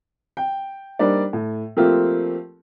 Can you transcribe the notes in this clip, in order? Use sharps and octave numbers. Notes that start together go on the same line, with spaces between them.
G5
G3 A#3 D4 D#4 C5 D5
A2
F3 A3 A#3 C4 F4 G4